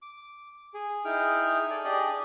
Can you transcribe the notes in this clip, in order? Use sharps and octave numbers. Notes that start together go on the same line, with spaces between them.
D6
G#4
D#4 E4 G#4 G5 F6
A4 D5 G#5
D4 G4 G#4 D5 D#5